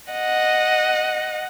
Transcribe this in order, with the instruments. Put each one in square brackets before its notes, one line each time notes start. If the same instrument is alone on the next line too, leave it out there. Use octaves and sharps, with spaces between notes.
[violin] D#5 F#5